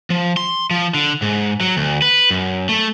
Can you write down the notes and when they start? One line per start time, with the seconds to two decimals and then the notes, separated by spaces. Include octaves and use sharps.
0.10 F3
0.37 C6
0.71 F3
0.94 D3
1.22 G#2
1.61 F#3
1.77 D2
2.02 B4
2.30 F#2
2.69 A3